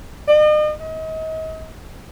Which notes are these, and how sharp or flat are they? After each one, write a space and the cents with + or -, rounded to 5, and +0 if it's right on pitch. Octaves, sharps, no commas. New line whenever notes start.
D#5 -40
D#5 +35